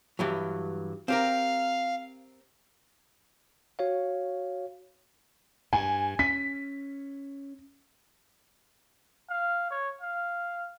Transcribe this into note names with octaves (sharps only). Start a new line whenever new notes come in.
G2 E3 F#3
C4 G4 A#4 F5
F#4 C#5 F5
G2 G#5
C#4 B6
F5
C#5
F5